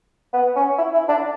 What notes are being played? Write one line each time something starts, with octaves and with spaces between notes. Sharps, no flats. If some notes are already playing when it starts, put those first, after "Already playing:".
B3
C#4
E4
E4
D4